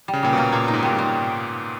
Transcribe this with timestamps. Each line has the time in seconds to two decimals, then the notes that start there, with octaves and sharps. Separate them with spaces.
0.08 G3
0.13 C#3
0.23 A#2 G3
0.33 B2
0.38 A#3
0.52 A#2 A#3
0.68 D#4
0.74 G#2
0.83 A#2 G3
0.93 G#2
0.99 G3